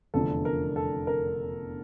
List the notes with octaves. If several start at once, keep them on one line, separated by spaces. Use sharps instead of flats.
F1 E2 D3 F3 A4
A#4
A4
A#4